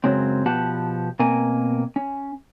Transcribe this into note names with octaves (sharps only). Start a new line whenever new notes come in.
F#2 A#2 C#3 F#3 G#3 C4
B2 F3 B3 G4 F#5 A5
B2 A#3 C4 A#4 G#5
C#4